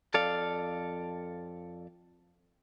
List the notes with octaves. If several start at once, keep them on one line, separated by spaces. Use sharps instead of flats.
F2 A4 D5 F5